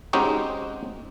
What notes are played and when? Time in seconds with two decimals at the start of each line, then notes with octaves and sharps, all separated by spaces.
0.13 G#3 C4 C#4 D#4 F#4 G4